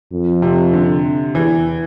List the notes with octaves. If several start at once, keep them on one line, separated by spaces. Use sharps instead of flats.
F2
C3
D3
E2 E3